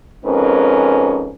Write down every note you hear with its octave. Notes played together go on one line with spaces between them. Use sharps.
F2 G#2 C4 C#4 A#4 B4